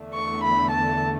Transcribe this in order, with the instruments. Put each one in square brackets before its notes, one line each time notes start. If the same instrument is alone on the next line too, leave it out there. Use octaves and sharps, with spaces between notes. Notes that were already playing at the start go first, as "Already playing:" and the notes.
Already playing: [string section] E2 D3 A3
[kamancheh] C#6
B5
A5